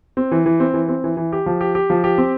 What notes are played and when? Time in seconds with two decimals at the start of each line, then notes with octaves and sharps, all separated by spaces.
0.17 C4
0.32 E3
0.46 E3
0.60 C4
0.74 E3
0.88 C4
1.04 E3
1.17 E3
1.33 G4
1.46 F3
1.61 G4
1.75 G4
1.90 F3
2.04 G4
2.18 C4